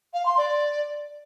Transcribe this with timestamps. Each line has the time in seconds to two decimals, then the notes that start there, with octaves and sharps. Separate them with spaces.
0.14 F5
0.26 C6
0.38 D5